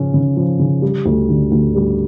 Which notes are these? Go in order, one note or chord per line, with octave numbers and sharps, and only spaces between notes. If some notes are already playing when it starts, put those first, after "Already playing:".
Already playing: C#3 F3 C#4
C#3
F3
C#3
G3
D2
D3
D2
G3